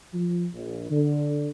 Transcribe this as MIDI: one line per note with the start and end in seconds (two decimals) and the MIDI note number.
0.13 0.46 53
0.53 0.86 34
0.91 1.48 50